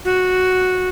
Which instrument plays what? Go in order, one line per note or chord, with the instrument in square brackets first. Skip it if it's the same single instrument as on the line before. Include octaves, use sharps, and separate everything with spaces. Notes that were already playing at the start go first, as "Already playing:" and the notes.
[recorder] F#4